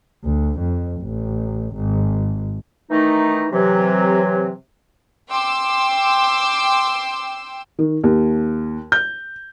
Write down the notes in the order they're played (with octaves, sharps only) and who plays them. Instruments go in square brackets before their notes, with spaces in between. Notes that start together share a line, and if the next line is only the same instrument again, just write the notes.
[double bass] D2
F2
A1
G#1
[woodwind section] D#3 E3 A3 D#4
C3 E3 F#3
[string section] G5 C6 D6 E6
[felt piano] D#3
D#2
G6